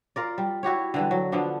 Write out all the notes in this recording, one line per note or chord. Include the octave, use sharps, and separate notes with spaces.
F4 A#4 D5
G3
E4 F#4 G4 C#5
D3 E3 G3
F#3
D3 F3 B3 D4